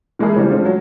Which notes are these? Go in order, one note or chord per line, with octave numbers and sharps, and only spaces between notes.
E3 G#3 A3 E4 G#4 A#4
C#3 E3 G3 C4
G#3 A3 C4 D4 F4
F#3